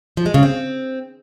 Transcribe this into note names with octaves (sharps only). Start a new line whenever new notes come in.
F3
G#3
C#3
C4